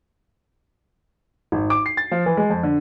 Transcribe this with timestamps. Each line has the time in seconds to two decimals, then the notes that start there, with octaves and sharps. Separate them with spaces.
1.52 G#1
1.70 D6
1.86 C7
1.97 A6
2.11 F3
2.26 E3
2.37 G#3
2.50 F2
2.63 D3